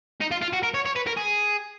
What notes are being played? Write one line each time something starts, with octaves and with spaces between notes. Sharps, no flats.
D#4
F4
F4
F#4
A#4
C#5
C#5
B4
A#4
G#4